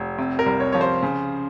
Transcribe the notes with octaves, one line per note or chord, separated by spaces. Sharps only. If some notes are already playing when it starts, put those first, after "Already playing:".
Already playing: F1
C3
A#4
C2
C#5
F3 C#5
C5
C#3